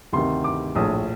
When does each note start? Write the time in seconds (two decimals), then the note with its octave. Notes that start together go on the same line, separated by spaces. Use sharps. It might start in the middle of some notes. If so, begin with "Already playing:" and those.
0.13 D2 C3 D#3 C6
0.44 D6
0.75 A#1 A2 D#6